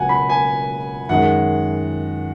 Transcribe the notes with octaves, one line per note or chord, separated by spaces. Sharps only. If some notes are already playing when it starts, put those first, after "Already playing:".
Already playing: C#2 B2 F#3 F#5 G#5
B5
G#5
F#2 D#3 G#3 F#5